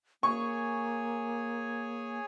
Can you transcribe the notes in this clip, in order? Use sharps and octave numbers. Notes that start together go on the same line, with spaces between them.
A#3 G#4 C#5 G#5 C#6